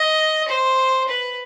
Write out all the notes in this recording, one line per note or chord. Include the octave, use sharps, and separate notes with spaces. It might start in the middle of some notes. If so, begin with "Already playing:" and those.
Already playing: D#5
C5
B4